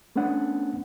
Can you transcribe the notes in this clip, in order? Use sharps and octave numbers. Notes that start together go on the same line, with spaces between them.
A3 B3 C#4 D4 F#5